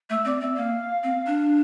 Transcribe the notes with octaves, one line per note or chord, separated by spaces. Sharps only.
A3 E5
C4 D5
C4 E5
A#3 F5
C4
D4